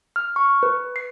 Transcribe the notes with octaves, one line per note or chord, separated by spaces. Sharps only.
F6
C#6
B4
C7